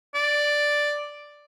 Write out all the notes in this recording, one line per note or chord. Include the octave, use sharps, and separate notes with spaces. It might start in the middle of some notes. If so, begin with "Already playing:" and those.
D5